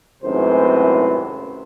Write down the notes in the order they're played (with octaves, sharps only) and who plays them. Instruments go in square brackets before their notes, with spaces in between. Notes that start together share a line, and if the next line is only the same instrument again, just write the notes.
[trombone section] G#1 F#2 A2 C3 B4 C5